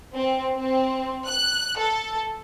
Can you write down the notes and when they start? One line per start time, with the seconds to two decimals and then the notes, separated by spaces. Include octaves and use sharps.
0.15 C4
0.56 C4
1.28 F#6
1.79 A4